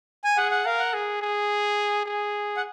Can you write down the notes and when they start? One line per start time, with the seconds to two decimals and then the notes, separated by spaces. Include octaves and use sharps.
0.24 G#5
0.37 G#4 F#5
0.51 F#5
0.65 A#4 F5
0.79 F#5
0.94 G#4
1.22 G#4
2.06 G#4
2.57 F#5